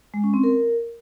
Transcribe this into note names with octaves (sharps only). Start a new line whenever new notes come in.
G#3
C#4
C4
A#4